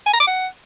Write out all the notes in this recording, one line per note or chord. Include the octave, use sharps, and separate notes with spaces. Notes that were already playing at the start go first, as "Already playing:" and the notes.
G#5
A#5
D6
F#5